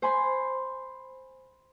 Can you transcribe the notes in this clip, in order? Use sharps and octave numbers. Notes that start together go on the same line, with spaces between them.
C5 G#5 B5 C6